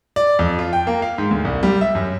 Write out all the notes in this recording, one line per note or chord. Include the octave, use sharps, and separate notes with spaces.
D5
F2
F4
G5
A#3
F5
G#2
D2
C2
G3
E5
F#2